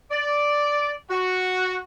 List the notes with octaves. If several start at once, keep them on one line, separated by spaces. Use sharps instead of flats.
D5
F#4